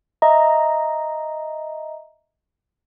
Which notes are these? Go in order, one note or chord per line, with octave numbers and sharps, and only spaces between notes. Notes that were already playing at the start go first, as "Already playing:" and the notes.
D#5 E5 A#5